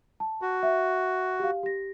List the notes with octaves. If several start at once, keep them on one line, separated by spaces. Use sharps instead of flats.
A5
F#4
E5
G4 F5
G4 A#6